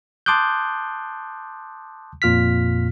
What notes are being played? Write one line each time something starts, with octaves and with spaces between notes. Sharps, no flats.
A5 C6 D6 D#6 F#6 G6
F2 A#2 F4 F6 B6